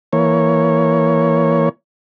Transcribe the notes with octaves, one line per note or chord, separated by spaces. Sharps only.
E3 A#3 C#5